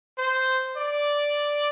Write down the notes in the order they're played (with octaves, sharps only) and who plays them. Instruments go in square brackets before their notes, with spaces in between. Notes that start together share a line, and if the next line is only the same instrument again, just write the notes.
[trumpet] C5
D5